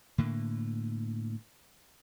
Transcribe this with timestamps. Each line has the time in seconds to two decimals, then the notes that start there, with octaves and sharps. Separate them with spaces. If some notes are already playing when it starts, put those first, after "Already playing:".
0.18 A2 D3 A#3